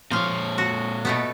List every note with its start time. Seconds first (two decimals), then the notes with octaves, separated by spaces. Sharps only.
0.11 A#2 F3 C#5 F5
0.58 F#4
1.05 B2 A3 B3